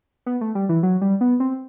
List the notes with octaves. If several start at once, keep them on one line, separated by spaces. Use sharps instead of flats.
B3
A3
G3
E3
F#3
G3
B3
C4